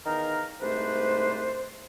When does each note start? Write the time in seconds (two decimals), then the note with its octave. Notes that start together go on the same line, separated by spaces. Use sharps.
0.06 E2 D#3 D#4 A#4 F5 A#5
0.61 C2 G#2 A3 D4 B4 C5